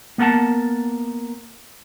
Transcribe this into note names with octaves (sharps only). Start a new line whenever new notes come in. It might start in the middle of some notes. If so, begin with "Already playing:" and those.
A#3 B3 A#4 F#5 A5